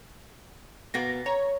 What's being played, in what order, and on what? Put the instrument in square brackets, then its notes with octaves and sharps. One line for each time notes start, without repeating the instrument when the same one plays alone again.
[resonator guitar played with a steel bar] B2 A#3 B3 [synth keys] A#6
[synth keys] C#5 [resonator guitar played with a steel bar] A#5